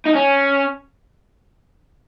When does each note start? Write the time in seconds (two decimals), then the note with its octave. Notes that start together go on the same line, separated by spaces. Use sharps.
0.06 D#4
0.15 C#4